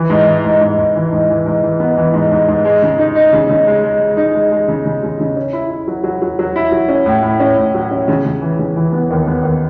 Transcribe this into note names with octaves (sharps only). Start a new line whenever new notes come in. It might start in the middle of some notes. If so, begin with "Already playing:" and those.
Already playing: E3
G#2
E3
G#2
G#2
G#2
E3
G#2
E3
G#2
E3
B3
E3
G#2
G#2
G#2
G#3
C#3
D#4
D#4
C#3
C#3
G#3
G#3
G#3
D#4
G#3
G#3
C#3
C#3
C#3
C#3
C#4
E4
E4
F#3
F#3
F#3
F#3
E4
F#3
C#4
A2
A2
C#4
A2
F#3
C#4
C#3
C#3
E3
C#3
E3
B3
D#2
B3
D#2